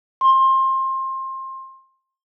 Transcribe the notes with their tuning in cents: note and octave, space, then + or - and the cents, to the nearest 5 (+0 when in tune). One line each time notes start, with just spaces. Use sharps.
C6 +25